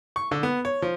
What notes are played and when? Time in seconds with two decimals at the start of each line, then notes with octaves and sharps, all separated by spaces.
0.16 C#6
0.31 D3
0.43 B3
0.65 C#5
0.82 F3